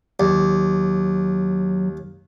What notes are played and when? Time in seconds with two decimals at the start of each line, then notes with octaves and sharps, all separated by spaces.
0.20 D#2 F#3